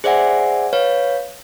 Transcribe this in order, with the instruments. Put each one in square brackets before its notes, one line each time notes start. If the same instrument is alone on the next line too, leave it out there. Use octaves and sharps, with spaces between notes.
[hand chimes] G#4 C5 D5 E5 F#5 G#5
B4 C#5 F5